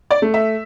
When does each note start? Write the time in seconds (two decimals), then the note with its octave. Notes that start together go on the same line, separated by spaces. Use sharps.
0.11 D5
0.22 A3
0.34 E5